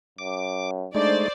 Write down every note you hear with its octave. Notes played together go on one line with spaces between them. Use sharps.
F#2 D6
G#3 A3 D4 D#4 C5 D5